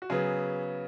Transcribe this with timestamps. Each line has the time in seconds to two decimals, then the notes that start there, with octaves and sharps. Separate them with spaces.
0.02 F#4
0.10 C#3 F#3 B3 G#4